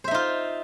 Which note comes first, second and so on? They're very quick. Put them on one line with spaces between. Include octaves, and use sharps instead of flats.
C5 E5 D#4 F4